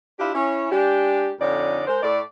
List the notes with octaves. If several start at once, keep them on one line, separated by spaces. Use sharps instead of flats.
D4 E4 F4 G4
C#4 E4
G#3 D4 G4
F2 D3 C#4 D#4 D5
G#3 A#4 C5
A2 A3 D5